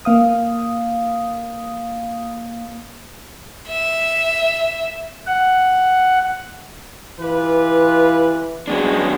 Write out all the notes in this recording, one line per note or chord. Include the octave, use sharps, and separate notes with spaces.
A#3 F5 D#6
E5
F#5
E3 F4 G4 B4
C#3 F#3 G#3 B3 D4